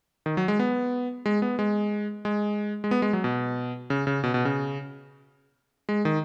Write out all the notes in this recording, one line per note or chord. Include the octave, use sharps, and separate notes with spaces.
D#3
F#3
G#3
B3
G#3
B3
G#3
G#3
G#3
B3
G#3
F#3
B2
C#3
C#3
B2
B2
C#3
G#3
D#3